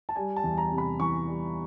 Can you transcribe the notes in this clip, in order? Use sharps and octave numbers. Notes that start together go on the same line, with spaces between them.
A5
G3 G#5
A5
E2
A#5
C3
B5
E3 C#6
G3